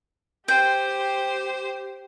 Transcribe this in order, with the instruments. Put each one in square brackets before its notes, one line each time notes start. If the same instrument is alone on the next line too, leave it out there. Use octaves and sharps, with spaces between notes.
[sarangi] G4 [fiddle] C5 [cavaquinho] G5